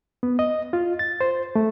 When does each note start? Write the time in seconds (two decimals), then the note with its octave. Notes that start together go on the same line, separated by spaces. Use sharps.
0.23 B3
0.39 D#5
0.73 F4
0.99 A6
1.21 C5
1.56 A3